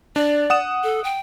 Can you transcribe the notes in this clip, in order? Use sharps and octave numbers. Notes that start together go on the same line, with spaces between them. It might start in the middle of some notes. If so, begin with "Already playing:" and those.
D4 D5
F#5 D#6 E7
A4
G5